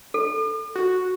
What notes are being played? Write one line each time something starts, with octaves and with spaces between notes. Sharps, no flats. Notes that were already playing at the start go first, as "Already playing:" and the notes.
A4
F#4